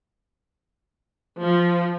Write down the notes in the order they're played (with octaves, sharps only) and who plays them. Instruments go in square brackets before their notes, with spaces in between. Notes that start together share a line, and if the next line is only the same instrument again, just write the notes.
[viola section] F3